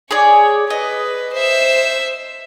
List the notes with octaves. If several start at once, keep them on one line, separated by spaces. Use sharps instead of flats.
G#4 C#5 D5
B4 D#5
C5 E5